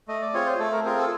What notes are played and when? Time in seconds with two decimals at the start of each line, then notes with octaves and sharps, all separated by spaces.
0.08 A3 D#5
0.22 D5
0.33 C4 F4 G#4 C#5
0.47 C5
0.59 A3 A4
0.72 A#4
0.84 C4 F4 G#4 A#4
0.98 A4